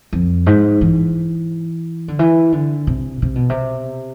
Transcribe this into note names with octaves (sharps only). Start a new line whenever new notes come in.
F2
G#2
E3
D3
E3
D3
C3
C3
B2
C3